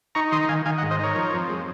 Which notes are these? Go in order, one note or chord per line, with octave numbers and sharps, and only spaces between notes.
D#4 A#5 C#6
D#3 C6 D#6
D#3 F5 G#5
D#3 F5 G#5
D#5 F#5
G#2
C5 D#5
D#4 A#4 C#5
F3
F2
G#3